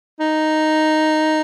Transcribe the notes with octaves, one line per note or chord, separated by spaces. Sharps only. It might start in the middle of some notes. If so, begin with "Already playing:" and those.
D#4